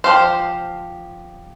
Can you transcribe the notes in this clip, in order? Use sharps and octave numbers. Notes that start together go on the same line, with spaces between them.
F3 C4 G4 C5 F5